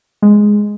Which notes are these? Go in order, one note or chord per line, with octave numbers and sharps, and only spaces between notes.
G#3